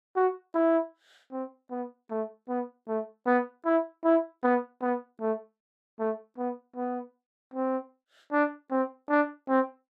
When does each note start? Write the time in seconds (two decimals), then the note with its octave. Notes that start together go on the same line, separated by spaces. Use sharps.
0.16 F#4
0.55 E4
1.32 C4
1.71 B3
2.10 A3
2.49 B3
2.88 A3
3.27 B3
3.65 E4
4.04 E4
4.44 B3
4.82 B3
5.21 A3
5.99 A3
6.38 B3
6.76 B3
7.54 C4
8.32 D4
8.71 C4
9.10 D4
9.49 C4